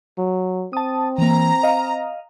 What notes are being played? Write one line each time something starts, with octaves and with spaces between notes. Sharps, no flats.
F#3
C4 A5 D#6
E3 A#3 A#5
D#5 F5